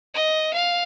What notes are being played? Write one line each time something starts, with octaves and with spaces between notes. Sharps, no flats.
D#5
F5